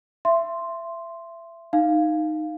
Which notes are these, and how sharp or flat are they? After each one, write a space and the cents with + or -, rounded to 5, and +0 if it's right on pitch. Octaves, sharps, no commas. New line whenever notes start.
E5 +25 C6 +0
D#4 -5 F5 +0